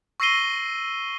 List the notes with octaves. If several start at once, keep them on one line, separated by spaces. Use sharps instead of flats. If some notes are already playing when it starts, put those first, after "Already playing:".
C#6 E6 A#6 C7 D#7 G7